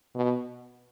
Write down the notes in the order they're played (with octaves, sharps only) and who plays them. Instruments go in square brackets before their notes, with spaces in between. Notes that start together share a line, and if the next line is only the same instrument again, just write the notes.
[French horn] B2